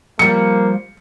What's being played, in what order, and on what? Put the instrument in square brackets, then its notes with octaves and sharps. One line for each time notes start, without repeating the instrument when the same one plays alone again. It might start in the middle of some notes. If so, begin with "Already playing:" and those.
[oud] F3 G3 [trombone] A#3 [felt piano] C#7